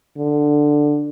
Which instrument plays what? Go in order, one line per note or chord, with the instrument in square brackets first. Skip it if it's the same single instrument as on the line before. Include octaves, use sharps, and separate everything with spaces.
[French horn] D3